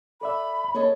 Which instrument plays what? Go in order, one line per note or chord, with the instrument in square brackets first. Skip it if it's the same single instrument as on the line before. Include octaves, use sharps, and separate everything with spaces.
[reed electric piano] A4 D5 E5 [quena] B5
[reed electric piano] A#3 D#5 [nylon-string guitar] G#4 A4 C#5